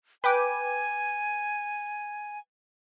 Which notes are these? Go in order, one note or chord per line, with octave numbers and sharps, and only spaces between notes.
B4 G5 G#5 D6